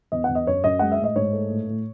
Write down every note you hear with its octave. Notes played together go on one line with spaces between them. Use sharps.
E2 D#5
E2 F#5
D#5
F#2 C#5
F#2 D#5
G#3 F#5
E5
A2
D#5
G#2 C#5
A3
A2
A2